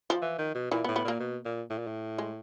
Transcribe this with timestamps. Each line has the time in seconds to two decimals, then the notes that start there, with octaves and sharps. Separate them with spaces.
0.10 F3 F4
0.22 E3
0.38 D#3
0.55 B2
0.71 A#2 E3 E4
0.84 B3
0.88 A2
0.96 B3
1.05 A#2 A#3
1.20 B2
1.45 A#2
1.70 A2
1.78 A#2
1.87 A2
2.18 G#3